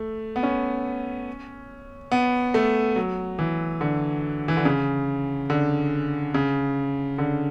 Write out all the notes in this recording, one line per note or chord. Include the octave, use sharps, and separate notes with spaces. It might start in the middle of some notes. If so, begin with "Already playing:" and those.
Already playing: A3
B3
C#4
B3
A3
F#3
E3
D3
E3
D3
C#3
D3
C#3
D3